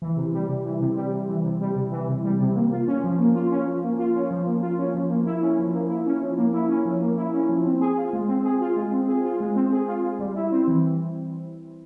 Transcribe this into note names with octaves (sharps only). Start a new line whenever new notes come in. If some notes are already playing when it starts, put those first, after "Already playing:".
E3
C3
G3
C3
E3
C3
G3
C3
E3
C3
G3
C3
E3
C3
G3
C3
A#3
F4
C#4
F3
A#3
F4
C#4
F3
A#3
F4
C#4
F3
A#3
F4
C#4
F3
A#3
E4
C#4
F3
A#3
E4
C#4
F3
A#3
E4
C#4
F3
A#3
E4
C#4
F3
C4
G#4
F4
G#3
C4
G#4
F4
G#3
C4
G#4
F4
G#3
C4
G#4
F4
G#3
G3
E4
C4
E3